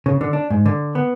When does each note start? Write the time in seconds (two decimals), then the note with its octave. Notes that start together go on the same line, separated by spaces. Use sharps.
0.06 C#3
0.21 D3
0.33 D4
0.50 G#2
0.66 D3
0.95 B3